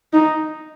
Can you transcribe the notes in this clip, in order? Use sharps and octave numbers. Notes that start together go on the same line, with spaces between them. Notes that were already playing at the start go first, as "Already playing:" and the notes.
D#4